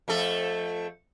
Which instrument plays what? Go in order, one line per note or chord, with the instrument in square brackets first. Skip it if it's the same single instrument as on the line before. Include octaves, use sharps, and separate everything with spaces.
[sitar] F2 A3 A4